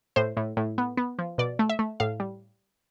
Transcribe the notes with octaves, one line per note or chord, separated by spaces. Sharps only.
A2 C5
A2
A2
B3
B3
F3
B2 D5
A3
E5
A3
A2 F5
G3